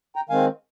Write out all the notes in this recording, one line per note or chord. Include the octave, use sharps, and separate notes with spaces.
G5 A#5
D#3 G#3 C4 F5 G#5